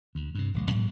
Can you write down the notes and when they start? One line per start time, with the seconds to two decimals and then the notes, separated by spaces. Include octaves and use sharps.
0.15 D2
0.35 G2 C3
0.54 D1 A#1 G#3
0.69 G#2 F#3 G#3 A#3